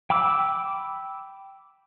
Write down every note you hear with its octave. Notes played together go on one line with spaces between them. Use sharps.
G5 B5 D6 E6